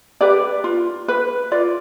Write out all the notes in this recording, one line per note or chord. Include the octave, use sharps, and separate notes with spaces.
G4 B4 D5
F4
B4
F4 D5